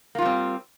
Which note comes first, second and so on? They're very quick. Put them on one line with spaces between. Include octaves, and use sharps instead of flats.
A#3 F4 G3 C4